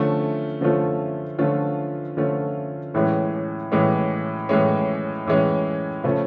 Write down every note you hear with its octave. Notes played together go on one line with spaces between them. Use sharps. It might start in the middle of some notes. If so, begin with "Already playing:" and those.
Already playing: D3 F3 A3 C#4 F4
D3 F3 A3 C#4 F4
D3 F3 A3 C#4 F4
D3 F3 A3 C#4 F4
A2 E3 G#3 C#4
A2 E3 G#3 C#4
A2 E3 G#3 C#4
A2 E3 G#3 C#4
C#3 F3 A3 C#4